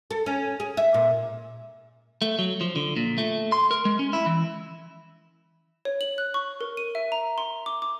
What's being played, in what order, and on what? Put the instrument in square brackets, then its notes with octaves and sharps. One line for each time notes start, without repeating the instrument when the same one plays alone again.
[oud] A4
C#4
G#4
E5
A#2
[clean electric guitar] A3
F#3
F3
D3
A#2
A3
C6
A#4
G#3
C#4
E4
E3
[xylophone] C#5
F#7
F#6
C#6
A#4
D#7
E5
A#5
C6
D6
D6